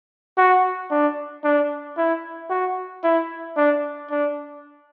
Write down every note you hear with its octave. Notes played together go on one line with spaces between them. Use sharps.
F#4
D4
D4
E4
F#4
E4
D4
D4